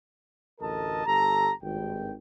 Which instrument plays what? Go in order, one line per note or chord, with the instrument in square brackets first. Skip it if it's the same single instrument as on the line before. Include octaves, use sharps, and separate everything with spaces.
[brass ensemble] A1 D2 A4 A#4 D#5 A5
G1 G4 A4 A#5
G#1 G2 G5